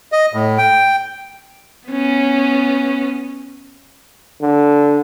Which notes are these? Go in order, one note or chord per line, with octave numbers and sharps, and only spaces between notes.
D#5
A2
G5
B3 C#4
D3